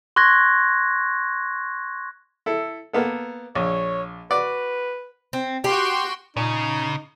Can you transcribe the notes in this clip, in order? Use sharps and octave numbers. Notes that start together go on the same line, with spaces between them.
C6 C#6 F#6 G#6 A#6
E4 A4
A#3 B3 A4
A#1 C#5
F#4 B4 D5
C4
F#4 G4 G5 C6
A#2 C#3 D#4